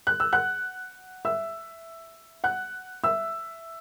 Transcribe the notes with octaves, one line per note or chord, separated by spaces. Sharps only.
F#6
E6
F#5 F#6
E5 E6
F#5 F#6
E5 E6